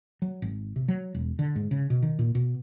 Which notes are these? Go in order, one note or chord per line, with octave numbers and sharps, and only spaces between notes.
F#3
G#1
C3
F#3
E1
D3
G#2
C#3
B2
D#3
A#2
B2